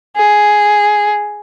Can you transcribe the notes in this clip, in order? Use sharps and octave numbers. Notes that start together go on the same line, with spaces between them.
G#4